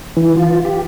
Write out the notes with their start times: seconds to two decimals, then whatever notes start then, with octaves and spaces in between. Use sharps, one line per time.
0.17 E3
0.37 F4
0.65 G4